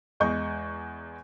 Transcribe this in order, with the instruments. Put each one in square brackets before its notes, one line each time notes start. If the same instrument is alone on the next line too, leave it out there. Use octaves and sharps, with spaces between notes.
[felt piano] E2 G#3 D#5 C#6 G6